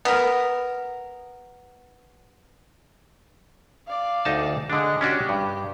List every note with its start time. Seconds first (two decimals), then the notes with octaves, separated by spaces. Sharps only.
0.05 B3 A#4
3.87 D5 F5
4.25 D2 D#4 A5
4.70 D3 G#3 D4 D#5
5.01 C#4 D4 F#4 G4
5.29 G2